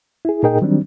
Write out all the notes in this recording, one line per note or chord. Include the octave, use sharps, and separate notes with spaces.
E4 G#4
A#2 D#4 G#4 A#4 D#5 G5
D#3 F#3 G3 C4 D4